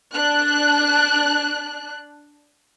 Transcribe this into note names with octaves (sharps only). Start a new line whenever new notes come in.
D4 F#6